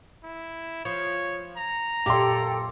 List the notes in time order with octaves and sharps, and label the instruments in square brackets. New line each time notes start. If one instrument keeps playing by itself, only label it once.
[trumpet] E4
[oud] F3 [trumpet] C#5
[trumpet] A#5
[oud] F#2 A#2 G4 [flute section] A4 G5 [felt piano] C6 D6